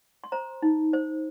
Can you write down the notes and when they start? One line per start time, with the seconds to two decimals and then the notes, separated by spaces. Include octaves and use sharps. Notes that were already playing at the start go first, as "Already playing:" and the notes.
0.24 C6
0.32 C5 A#5
0.62 D#4
0.93 C5